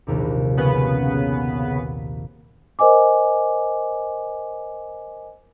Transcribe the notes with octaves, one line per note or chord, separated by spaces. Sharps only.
A#1 D#2 C3
C#3 B3 B4
A#4 C5 D#5 G#5 D6